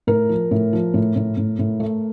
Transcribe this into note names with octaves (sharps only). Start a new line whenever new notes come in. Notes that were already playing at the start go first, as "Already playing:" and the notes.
A2 A#4
F3
A2
F3
A2
A2
A2
A2
A3